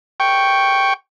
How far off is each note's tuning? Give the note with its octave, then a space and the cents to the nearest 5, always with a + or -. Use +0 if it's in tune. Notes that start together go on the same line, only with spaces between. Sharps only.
G5 +0 C#6 +0